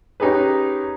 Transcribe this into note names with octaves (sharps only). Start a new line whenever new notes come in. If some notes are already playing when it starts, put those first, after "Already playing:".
C#4 D#4 G4 G#4 B4